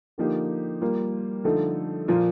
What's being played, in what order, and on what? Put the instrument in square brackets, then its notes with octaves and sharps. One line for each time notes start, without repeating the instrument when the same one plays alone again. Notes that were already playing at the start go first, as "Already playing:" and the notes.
[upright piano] D3 F3 A#3 D#4 G4
G3 A#3 F4 A#4
D3 F3 A3 D#4 A4
A#2 F3 A#3 F4